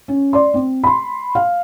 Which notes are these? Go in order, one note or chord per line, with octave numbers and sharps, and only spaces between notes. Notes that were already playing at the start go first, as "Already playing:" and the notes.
C#4
D5 C6
C4
B5 C6
F5